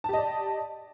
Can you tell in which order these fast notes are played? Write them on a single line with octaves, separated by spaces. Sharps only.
A5 G4 D#5 D5